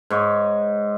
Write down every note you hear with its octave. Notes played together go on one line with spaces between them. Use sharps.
G#2 C#5 D#5